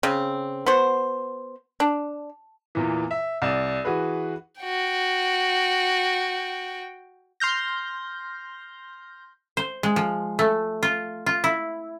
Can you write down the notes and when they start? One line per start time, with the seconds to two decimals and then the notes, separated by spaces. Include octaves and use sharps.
0.03 C#3 C4
0.66 B3 F#4 C5
1.80 D4
2.75 E2 A#2 E3
3.11 E5
3.42 C2 D5 E7
3.85 E3 F#4 G#4 B4
4.61 F#4 G5
7.40 C6 F6 G6 A#6
9.57 C5
9.83 G#3
9.96 F3
10.39 A3
10.83 F4
11.26 F4
11.44 E4